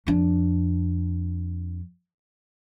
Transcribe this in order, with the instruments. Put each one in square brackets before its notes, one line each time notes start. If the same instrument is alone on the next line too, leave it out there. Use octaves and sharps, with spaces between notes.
[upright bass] F2 D4